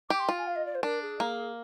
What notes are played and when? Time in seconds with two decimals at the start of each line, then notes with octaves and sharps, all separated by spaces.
0.09 G4 D6
0.19 C6
0.29 F4
0.38 G#5
0.47 F5
0.55 D#5
0.65 D5
0.74 C5
0.83 D4 A#4
1.02 G#4
1.20 A#3